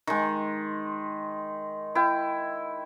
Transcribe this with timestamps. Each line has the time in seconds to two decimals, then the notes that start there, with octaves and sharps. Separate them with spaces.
0.07 D#3 G#3
1.95 E4 G5